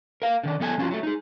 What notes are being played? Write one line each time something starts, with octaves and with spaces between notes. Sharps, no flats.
A#4 F5
D3 D#3 D5
F3 B3 A4 F#5 G#5 A5
F3 C4 C#4 F4 F#4
F#3 A3
D#4 G#4